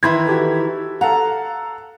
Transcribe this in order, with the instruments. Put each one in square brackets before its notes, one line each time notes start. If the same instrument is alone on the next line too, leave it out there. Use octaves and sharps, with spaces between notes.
[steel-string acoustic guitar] D#3 E3 E4 [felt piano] B5 C6 G#6
[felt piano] F#4 G4 A4
[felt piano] A4 F5 F#5 [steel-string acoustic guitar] A#5